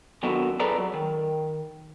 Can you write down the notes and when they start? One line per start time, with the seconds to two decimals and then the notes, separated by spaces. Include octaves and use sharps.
0.23 D#3 F#3 B3 D4 F#4 A4
0.60 G#4 A4 B4 D5 A#5
0.78 F#3
0.94 D#3